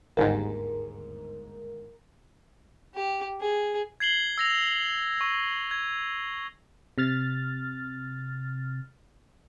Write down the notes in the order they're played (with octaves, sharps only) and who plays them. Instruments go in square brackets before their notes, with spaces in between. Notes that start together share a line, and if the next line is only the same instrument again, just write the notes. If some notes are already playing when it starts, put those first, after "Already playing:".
[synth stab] G1 D#2 G#2 [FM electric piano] A#4
[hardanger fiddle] G4
G#4
[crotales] G#6 C7 F#7 G7
E6 A#6 F7
C#6
G#6
[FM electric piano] C3 F6 A6